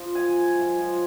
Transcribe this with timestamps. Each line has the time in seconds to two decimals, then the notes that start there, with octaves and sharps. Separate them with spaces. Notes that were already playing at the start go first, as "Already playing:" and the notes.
Already playing: F3
0.14 F#2 G#5
0.36 G#3
0.58 F#2
0.79 F3